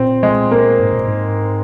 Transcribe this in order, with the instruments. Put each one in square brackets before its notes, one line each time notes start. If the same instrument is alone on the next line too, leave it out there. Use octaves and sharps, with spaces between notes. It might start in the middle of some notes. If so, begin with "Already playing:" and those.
Already playing: [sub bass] A#2 [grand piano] C4
[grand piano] G#3
A#3
[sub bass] G#2
A#2
G#2